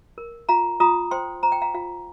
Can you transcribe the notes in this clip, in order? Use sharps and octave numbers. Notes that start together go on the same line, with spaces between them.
A#4
F4 F5 A#5
F4 A#5 D#6
C5 G5 C6
C5 A#5
G5
F5 A#5
F4 F5